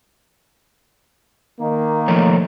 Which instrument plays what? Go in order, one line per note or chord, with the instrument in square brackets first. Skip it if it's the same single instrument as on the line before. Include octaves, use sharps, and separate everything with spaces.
[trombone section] D#3 A#3
[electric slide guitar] F3 A3 C#5